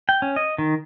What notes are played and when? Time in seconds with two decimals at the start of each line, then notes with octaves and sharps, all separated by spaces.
0.09 G5
0.22 C#4
0.36 D#5
0.58 D#3